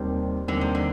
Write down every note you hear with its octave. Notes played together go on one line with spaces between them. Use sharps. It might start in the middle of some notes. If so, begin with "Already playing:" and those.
Already playing: D#2 C3 D#3 G3 C4
D#2 D3 D#3 G3 C4
C3
D3